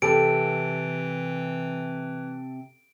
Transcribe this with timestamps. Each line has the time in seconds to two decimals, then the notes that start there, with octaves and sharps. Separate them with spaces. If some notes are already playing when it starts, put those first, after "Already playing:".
0.02 C3 E3 G4 A4 D7